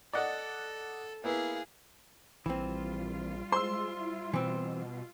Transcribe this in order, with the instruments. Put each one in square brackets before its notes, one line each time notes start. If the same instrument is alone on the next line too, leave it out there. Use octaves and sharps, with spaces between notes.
[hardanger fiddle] A4 [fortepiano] D5 D#5 F#5
[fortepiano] A#3 B3 E4 [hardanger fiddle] G#4 F5
[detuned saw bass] A#1 [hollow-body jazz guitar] E3 C4 [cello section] G3 F4
[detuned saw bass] G#3 [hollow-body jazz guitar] C5 [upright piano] C6 E6
[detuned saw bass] E4
[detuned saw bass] B2 [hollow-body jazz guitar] E3 C4